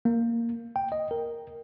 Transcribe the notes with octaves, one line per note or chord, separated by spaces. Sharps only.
A#3
G5
D#5
A#4